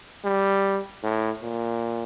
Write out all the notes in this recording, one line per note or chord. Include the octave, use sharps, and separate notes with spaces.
G3
A2
A#2